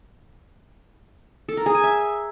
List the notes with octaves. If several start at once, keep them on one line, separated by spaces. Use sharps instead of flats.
A4
A#4
G#4
G#5
E5